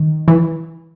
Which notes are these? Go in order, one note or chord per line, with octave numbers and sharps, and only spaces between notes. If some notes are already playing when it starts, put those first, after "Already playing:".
Already playing: D#3
E3